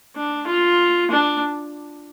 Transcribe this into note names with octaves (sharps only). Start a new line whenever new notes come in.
D4
F4
D4